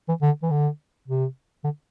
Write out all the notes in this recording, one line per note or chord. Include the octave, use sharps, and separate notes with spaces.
E3
D3
E3
D3
C3
D3